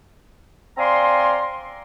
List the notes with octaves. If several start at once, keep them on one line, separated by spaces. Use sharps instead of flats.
C4 D5 F5 G#5 A#5 C6